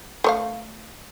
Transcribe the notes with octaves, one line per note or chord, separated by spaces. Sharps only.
A3 C#5 F5